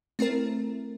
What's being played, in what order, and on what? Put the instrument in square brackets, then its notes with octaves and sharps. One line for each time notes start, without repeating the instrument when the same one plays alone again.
[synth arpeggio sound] A3 C4 E4 A#4